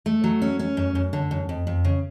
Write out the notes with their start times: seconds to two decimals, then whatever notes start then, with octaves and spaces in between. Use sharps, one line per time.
0.06 A3
0.24 F#3
0.42 C#4
0.59 C#4
0.77 F#2
0.95 F#2
1.13 D3
1.31 F#2
1.49 F2
1.67 F2
1.85 C#3